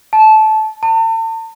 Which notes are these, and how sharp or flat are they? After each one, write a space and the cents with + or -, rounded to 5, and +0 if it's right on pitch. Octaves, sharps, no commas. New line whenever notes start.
A5 -20
A5 +40